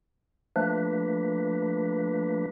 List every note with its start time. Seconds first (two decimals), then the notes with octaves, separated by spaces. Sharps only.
0.56 F3 A3 A#3 D4 B4